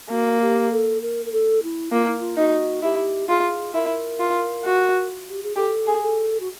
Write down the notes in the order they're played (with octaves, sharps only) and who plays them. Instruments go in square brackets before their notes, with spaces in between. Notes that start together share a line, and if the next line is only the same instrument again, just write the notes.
[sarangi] A#3 [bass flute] F#4
[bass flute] G4
A4
A#4
A#4
A4
E4
[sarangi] A#3 [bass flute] F4
[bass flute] E4
F4
[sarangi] D#4 [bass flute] F#4
[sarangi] E4 [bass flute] G4
[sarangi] F4 [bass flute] G#4
[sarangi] E4 [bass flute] A#4
[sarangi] F4
F#4
[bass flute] G4
G#4
[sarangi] G4 [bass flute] A4
[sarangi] G#4
[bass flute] A4
F#4